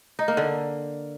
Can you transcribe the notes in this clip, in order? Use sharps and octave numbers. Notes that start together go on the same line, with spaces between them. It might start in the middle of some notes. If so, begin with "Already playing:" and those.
D#4
A#3
D3